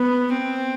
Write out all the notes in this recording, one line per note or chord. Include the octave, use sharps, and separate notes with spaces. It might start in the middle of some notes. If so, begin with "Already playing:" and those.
Already playing: B3
C4